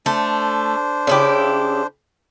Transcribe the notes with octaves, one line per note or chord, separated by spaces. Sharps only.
A3 D4 C5
C#3 E4 G4